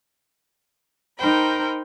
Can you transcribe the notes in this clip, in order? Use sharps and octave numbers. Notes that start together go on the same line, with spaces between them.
D#4 A#4 C5 G5 B5